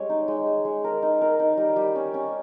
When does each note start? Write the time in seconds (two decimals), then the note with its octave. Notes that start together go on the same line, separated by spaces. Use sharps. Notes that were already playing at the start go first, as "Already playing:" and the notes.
Already playing: G3 G#3 C#4 C#5
0.10 D#4
0.28 G#3
0.47 G#3
0.65 G#3
0.84 A#4
1.03 D#4
1.22 A#4
1.39 D#4
1.57 G3
1.76 G3
1.95 C#4
2.14 C#4